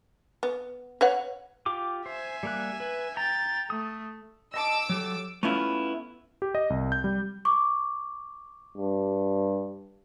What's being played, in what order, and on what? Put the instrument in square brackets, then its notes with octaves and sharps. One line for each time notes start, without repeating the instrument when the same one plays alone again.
[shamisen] B3
B4 C#5 F#5
[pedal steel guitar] F4 G4 D6
[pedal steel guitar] C5 [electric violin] E5 G#5
[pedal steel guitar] G3 A#3 F#6
B4
[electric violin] G5 A6 [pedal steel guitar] A#5
[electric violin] A3 [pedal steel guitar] D#6
[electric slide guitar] D#5 A5 [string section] D6 E6
[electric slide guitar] F#3 G4 A4
[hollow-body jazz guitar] A3 B3 C#4 E4 F4
[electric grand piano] G4
D#5
C2
G6
G3
[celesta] C#6 D6
[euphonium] G2